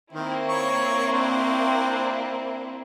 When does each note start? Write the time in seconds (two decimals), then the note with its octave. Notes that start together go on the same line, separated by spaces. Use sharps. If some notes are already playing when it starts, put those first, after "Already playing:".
0.13 D#3 A#3 C4 E4
0.49 C#5 C#6
1.12 D4 C5